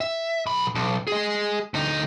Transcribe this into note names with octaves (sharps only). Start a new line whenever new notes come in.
E5
B1 B5
B1
G#4 D#5
D2 D#4